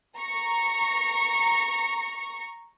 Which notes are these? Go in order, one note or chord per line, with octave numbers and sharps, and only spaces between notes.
A#5 C#6 C#7